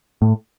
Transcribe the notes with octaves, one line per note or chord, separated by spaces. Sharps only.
A2